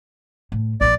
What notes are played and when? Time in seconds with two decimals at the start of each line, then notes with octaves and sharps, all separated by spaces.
0.52 A2
0.81 A#1 F3 D5